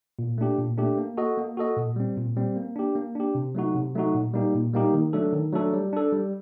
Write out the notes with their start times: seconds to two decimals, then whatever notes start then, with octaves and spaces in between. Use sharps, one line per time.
0.19 A#2
0.38 A3 D4 G4
0.58 A#2
0.78 A3 D4 G4
0.98 A#3
1.17 F#4 A4 D#5
1.37 A#3
1.57 F#4 A4 D#5
1.77 A#2
1.96 G3 C4
2.17 A#2
2.36 G3 C4
2.57 A#3
2.76 D4 G4
2.95 A#3
3.15 D4 G4
3.35 C3
3.55 F#3 A3 D#4 F#4
3.75 C3
3.95 F#3 A3 D#4 F#4
4.14 A#2
4.34 G3 A#3 D#4 G4
4.55 A#2
4.73 G3 A#3 D#4 G4
4.93 D#3
5.13 F#3 A3 D4 A4
5.33 D#3
5.52 F#3 A3 D4 A4
5.73 G3
5.93 D4 A4
6.12 G3